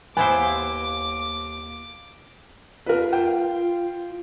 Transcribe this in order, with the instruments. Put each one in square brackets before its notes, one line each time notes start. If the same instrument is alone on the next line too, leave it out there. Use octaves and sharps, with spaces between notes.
[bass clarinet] D#2 [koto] B3 E4 C5 [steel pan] G#5 [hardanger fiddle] D6
[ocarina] F4 [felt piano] A#4 B4
[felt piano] G5